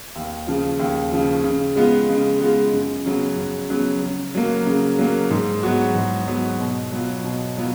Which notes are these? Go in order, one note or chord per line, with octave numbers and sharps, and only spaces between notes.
D#2
C#3 F3
D#2
C#3 F3
C#3
G#3 B3 F4
C#3
G#3 B3 F4
F#2
C#3 F#3 B3
F#2
C#3 F#3 B3
C#3
F#3 A#3
C#3
F#3 A#3
G#2
F#3 B3 F#4
G#2
F#3 B3 F#4
B2
F#3 B3 F4
B2
F#3 B3 F4